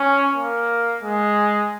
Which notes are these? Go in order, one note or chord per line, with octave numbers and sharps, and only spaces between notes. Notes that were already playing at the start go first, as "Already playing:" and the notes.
Already playing: C#4
A#3
G#3